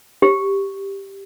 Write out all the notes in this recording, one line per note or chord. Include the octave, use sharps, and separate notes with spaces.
G4